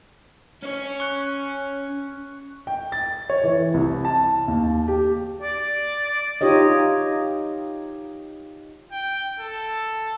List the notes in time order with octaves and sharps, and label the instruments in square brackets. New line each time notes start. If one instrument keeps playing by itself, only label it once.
[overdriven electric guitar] C#4 C#5
[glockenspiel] C#6 F#6
[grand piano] G5
A6
C#5
E3
C2
A5
D#2
G4
[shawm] D5
[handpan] D#4 F4 G4 C#5 D#5
[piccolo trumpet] G5
A4